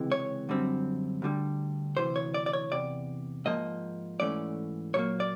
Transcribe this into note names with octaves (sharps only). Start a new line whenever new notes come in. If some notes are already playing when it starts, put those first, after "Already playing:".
Already playing: C#2 C3 E3 G#3
C#5
F#2 D3 G3 C4
D2 D3 G3
D2 C3 E3 C5
C#5
D5
D5
C#5
E2 C3 D5
G#2 F3 A#3 D#5
G#2 E3 A3 C#4 D5
A#2 F#3 A#3 C#5
D5